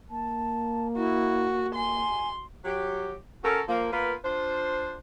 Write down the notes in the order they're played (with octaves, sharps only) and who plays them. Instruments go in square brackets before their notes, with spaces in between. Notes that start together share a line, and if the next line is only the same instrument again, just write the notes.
[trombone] A#3 [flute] A5
[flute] E4 [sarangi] F#4
[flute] G#5 [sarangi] C6
[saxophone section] F#3 G4
C#4 F#4 A4 A#4
F3 A#3
A#3 B3 F4 A#4 B4
D4 F4 C5